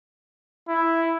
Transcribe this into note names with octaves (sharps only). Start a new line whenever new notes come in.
E4